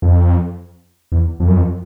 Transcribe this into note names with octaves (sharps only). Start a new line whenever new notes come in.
F2
E2
F2
F#2
F2